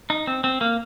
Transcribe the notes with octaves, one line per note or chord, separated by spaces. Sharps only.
D#4
C4
C4
A#3